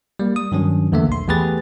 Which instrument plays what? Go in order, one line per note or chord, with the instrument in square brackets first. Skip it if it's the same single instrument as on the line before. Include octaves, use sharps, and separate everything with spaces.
[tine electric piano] G3 A#3
D#6
G2 D#3 F#3 C#4
E2 D3 A3 A#3 E5
B1 C6
E2 A3 G4 G#4 B4 A6